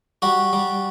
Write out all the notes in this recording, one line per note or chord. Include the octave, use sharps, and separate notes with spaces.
G3 F#4
G3